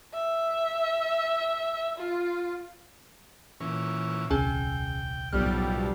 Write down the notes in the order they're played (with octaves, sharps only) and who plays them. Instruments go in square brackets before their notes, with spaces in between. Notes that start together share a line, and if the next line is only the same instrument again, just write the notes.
[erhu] E5
F4
[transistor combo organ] A#2 E3 C#4
[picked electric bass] D#1 C2 [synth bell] C#4 G#4 G#5 [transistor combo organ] G5
[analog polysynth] B1 G3 [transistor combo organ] F#2 A2 F3 [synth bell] F6